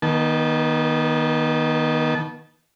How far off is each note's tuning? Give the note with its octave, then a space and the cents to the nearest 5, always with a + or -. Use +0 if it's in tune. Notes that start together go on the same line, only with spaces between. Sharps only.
D#3 +0 B3 -40 A5 -25